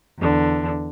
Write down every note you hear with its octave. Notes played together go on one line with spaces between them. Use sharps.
E2 D3